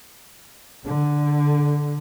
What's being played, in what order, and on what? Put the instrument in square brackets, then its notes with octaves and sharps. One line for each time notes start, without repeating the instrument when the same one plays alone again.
[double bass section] D3